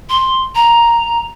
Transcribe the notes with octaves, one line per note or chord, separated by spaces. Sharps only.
C6
A#5